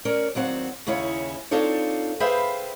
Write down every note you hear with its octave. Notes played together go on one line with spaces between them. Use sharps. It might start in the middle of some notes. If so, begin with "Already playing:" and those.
C#4 A#4 C#5 D5
D#2 F#3 C4 F#5
D#2 C#3 C#4 E4 G#4 C#5
C4 D4 D#4 F4 A4 C#5
G#4 B4 C5 E5 F5 G5